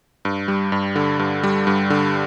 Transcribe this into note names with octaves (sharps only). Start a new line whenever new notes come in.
G2
G3
G2
D3
G2
G3
G2
D3